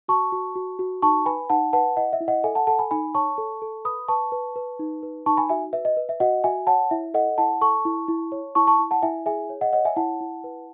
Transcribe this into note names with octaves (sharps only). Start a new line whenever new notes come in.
F#4 A5 C#6
F#4
F#4
F#4
D#4 A5 C#6
B4 G#5 B5
D#4 F#5 A5
B4 F#5 A5
E4 D#5 F#5
E5
E4
D#5 F#5
A4 E5 G#5
F#5 A5
A4 F#5 A5
G#5 B5
D#4 G#5 B5
C#5 A5 C#6
A4
A4
B4 B5 D#6
B4 A5 C#6
B4
B4
D#4
B4
D#4 A5 C#6
G#5 B5
F#4 E5 G#5
B4 E5
D#5
B4
E5
F#4 D#5 F#5
F#4 E5 G#5
C#5 F#5 A5
E4 E5
A4 D#5 F#5
E4 F#5 A5
A4 A5 C#6
E4
E4
C#5
E4 A5 C#6
A5 C#6
E4
F#5 A5
E4 E5 G#5
G#4 E5 G#5
C#5
D#5 F#5
C#5 D#5 F#5
E5 G#5
E4 F#5 A5
E4
B4